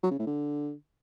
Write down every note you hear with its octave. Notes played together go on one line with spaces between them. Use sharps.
F#3
C#3
A2
D3